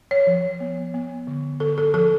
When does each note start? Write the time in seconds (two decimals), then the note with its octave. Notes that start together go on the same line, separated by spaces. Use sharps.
0.11 C#5
0.27 F3
0.60 B3
0.94 B3
1.27 D3
1.60 D3 A4
1.78 A4
1.94 F3 A4